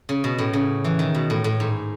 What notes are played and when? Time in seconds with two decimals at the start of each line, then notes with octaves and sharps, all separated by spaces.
0.09 C#3
0.24 B2
0.38 A2
0.53 C#3
0.84 E3
0.99 D#3
1.15 B2
1.30 A2
1.44 A2
1.60 G#2